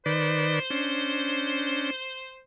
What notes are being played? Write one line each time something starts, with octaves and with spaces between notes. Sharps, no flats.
D#3 B4 C5 D5
C#4 D4